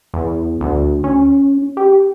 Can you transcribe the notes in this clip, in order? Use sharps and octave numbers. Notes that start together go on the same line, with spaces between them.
E2
D2
C#4
G4